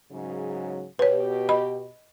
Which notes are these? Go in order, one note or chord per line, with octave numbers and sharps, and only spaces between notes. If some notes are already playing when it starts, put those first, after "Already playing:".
G#2 C#3 F#3
B2 G4 B4 C#5
D#5 B5